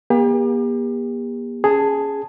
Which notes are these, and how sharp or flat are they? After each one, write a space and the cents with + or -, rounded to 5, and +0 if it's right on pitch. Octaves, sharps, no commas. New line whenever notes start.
A#3 +45 G4 +40
C#4 +10 G#4 +0 A5 +5